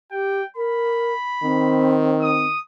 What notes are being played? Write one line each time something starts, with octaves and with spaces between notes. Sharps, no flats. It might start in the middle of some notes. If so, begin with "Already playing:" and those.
G4 G5
A#4 B5
D#3 C4
D#6